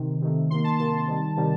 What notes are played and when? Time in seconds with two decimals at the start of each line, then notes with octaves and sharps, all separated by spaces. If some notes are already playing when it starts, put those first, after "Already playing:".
Already playing: C3 D#3
0.21 C3 D#3 A3
0.50 C3 D#3 A#3 C6
0.64 A5
0.79 C3 D#3 A#3 A5
1.07 C3 D#3 G3
1.36 C3 D#3 G3